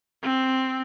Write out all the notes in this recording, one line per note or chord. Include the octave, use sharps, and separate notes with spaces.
C4